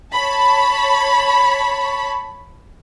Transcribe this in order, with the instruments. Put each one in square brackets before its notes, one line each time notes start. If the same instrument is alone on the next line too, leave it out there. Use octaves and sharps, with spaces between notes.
[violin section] C#5 A5 B5